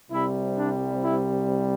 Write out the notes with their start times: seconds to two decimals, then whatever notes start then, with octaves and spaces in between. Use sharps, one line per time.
0.11 C2 C3 G3 E4
0.57 D4
1.01 E4